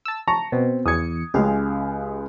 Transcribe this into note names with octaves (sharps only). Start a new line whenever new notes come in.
A5 E6
A5 A#5 C#6
B2 C4
E2 D#6 G#6 C#7
C#2 C#3 G#3 G4 F5